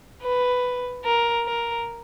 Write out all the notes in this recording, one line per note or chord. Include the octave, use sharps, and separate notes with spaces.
B4
A#4
A#4